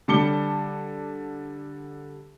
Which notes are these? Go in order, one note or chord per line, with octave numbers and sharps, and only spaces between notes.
D3 G3 A5 D6 C#7 G7